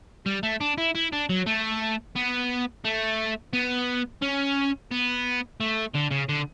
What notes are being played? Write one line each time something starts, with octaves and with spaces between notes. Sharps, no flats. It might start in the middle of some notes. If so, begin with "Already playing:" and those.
G3
A3
D4
E4
E4
D4
F#3
A3
B3
A3
B3
C#4
B3
A3
D3
C#3
D3